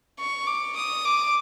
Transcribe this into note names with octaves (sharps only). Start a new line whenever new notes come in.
C#6
D6
D#6
D6